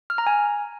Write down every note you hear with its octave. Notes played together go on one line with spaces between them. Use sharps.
F6
A#5
G#5